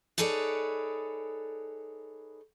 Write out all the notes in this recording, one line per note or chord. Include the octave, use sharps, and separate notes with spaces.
D#4 G#4 A4 B4 C#5 D5